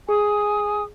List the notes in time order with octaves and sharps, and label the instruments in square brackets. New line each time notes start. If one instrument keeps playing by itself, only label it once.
[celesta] G#4 [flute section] G#5 D#6